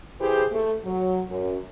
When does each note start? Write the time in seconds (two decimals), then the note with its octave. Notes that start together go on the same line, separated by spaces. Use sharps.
0.19 E3 E4 G4 G#4 C5
0.52 A3
0.84 F#3
1.29 F#2